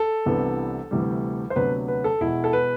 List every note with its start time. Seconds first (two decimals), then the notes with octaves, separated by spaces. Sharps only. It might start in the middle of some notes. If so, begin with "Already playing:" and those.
Already playing: A4
0.25 C2 C3 E3 B3 D4
0.91 D2 C3 E3 G3
1.50 C5
1.55 D2 C3 F#3 B3 D4 B4
1.88 B4
2.04 A4
2.21 E1 E2 B2 E4
2.44 A4
2.53 B4